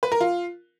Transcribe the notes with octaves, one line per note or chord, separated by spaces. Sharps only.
B4
A#4
F4